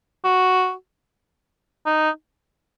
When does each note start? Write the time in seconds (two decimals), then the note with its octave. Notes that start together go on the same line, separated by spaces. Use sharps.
0.24 F#4
1.86 D#4